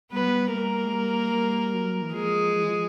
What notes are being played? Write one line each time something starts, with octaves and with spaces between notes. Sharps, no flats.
G3 B3 B4
F#3
G3
G3 A#3 A#4
G#3
G3
G3
F#3
E3
F3 G#3 G#4
F3
E3
F3